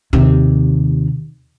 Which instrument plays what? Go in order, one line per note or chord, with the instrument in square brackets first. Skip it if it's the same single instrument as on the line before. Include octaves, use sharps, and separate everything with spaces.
[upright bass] D#2 C3